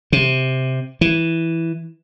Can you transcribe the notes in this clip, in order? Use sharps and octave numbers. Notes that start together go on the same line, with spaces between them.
C3
E3